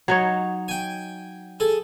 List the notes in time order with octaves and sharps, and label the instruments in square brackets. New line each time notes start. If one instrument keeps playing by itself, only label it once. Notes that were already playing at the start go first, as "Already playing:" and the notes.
[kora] F#3 D#4 C#5
[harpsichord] G5 G#5
G#4 A4